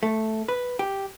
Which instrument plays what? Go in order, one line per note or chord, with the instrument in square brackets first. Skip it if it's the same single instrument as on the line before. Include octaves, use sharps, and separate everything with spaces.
[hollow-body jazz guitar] A3
B4
G4